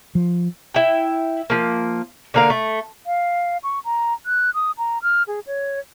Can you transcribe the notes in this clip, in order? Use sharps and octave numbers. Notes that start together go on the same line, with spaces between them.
F3
E4 G5
F3 A#3
D3 A#3 F5
A3
F5
C#6
A#5
F#6
D#6
A#5
F6
G#4
C#5